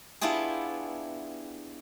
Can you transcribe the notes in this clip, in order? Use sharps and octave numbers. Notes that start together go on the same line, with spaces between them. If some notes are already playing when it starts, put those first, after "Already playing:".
B3 D4 E4 F4 G4 G#4